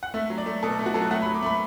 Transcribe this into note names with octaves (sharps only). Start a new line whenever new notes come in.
F#5
A3 E5
F#3
D5
A3
B2 A4
A3
F#4
F#3 A4
F#4
A3 F#5
B5
F#3
D6
A3 B5